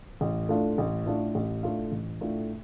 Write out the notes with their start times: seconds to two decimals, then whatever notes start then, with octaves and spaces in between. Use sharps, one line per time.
0.21 A1
0.49 A2 A3 D4 F4
0.78 A1
1.06 A2 A3 D4 F4
1.35 A1
1.63 A2 A3 D4 F4
1.92 A1
2.21 A2 A3 D4 F4